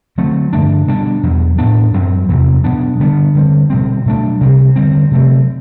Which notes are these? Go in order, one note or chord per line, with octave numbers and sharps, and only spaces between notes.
D3 F#3 A3 C4
G2 D3 A3 D4
B2 G3 D4
E2 B2 F#3
A2 E3 B3 D4
F#2 F#3 C4
E2 C3 E3 B3
B2 F#3 B3 D4
D3 G3 B3 D4
D3 G3 C4
B2 G3 C4
B2 F#3 A3 D4
C3 G3 C4
D3 G3 C4
C3 F#3 A3 C4